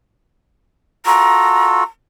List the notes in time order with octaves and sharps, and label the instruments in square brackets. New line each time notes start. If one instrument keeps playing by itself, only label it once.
[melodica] F4 F#4 A4 [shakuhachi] A#5